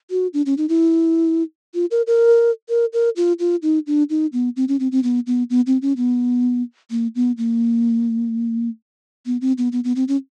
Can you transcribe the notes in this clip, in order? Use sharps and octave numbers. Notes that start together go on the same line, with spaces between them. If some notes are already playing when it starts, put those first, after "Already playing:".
F#4
D4
C#4
D#4
E4
F4
A#4
A#4
A#4
A#4
F4
F4
D#4
D4
D#4
B3
C4
C#4
C4
C4
B3
B3
B3
C4
C#4
B3
A#3
B3
A#3
B3
C4
B3
B3
B3
C4
C#4